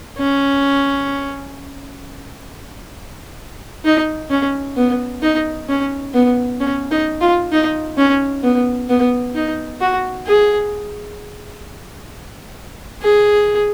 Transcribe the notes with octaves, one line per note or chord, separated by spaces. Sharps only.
C#4
D#4
C#4
B3
D#4
C#4
B3
C#4
D#4
F4
D#4
C#4
B3
B3
D#4
F#4
G#4
G#4